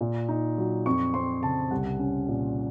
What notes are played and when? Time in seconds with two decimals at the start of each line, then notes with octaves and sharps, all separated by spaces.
0.01 A#2
0.29 D#4
0.58 F#3
0.86 F2 C#6
1.14 C4 C6
1.43 C#3 A5
1.71 C2 F#5
1.99 C#4
2.28 A#2